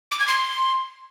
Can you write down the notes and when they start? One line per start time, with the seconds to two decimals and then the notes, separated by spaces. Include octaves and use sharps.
0.11 D6
0.19 G#6
0.28 C6